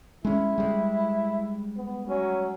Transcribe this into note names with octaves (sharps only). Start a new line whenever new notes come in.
G#3 C#4 E4
G3 G#3
B3
F#3 C#4